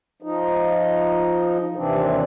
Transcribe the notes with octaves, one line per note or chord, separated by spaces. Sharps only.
F3 D#4
D#2 C3 E3 C4 D4